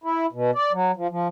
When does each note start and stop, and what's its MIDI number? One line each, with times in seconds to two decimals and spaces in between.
0.04 0.26 64
0.32 0.51 47
0.55 0.72 74
0.72 0.92 54
0.96 1.07 53
1.10 1.28 53